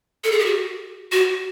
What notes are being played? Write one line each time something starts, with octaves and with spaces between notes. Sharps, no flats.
A4
G#4
G4
F#4
F#4